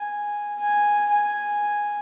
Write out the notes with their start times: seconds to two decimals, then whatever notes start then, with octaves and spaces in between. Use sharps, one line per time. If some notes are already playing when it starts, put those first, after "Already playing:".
Already playing: G#5
0.59 G#5
1.09 G#5